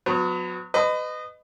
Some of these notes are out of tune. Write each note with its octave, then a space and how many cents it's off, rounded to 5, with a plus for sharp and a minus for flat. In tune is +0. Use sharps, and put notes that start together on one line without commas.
F#3 -30 B3 +25
B4 +30 D#5 -15